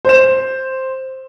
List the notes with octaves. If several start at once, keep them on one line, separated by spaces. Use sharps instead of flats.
C5 E7